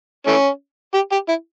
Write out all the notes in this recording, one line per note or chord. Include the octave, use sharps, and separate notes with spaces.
E3 A3 C#4
G4
G4
E4